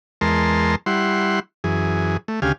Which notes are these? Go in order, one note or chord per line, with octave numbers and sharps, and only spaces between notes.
E2 G#3 A#4 A5 C6
G3 E4 F#5 C6
F#2 E3 G#4
A3
D2 C#3 G4 F5 G#5